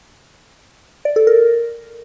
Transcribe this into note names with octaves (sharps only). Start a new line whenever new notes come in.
D5
A4
A#4